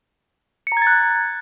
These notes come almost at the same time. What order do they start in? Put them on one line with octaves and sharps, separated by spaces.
C#7 A#5 G#6 A6 F#6